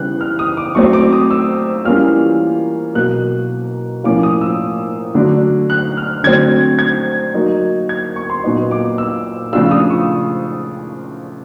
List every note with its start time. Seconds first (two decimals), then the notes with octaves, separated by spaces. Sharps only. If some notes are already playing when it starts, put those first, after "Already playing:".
Already playing: C#3 E3 G3 B3 F#6
0.21 F6
0.39 D#6
0.57 D6
0.75 F#3 A3 C4 C#6
0.93 D6
1.13 D#6
1.31 E6
1.85 E3 G3 A#3 C#4 F4 F6
2.95 B2 F#3 A#3 F#6
4.04 A2 F3 A#3 C#4 F4 D6
4.23 D#6
4.41 E6
5.14 D3 F#3 A3 D4
5.70 F#6
5.97 F6
6.24 D3 F#3 A3 C4 G#6
6.79 G#6
7.34 F#3 A#3 D#4
7.89 G#6
8.16 C#6
8.30 C6
8.44 A#2 F#3 B3 D#4
8.71 D6
8.98 E6
9.53 C#3 F3 A3 D4 F4 E6
9.71 D#6
9.90 C#6